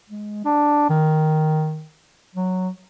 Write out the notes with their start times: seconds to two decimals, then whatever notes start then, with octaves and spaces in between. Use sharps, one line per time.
0.10 G#3
0.45 D4
0.89 D#3
2.35 F#3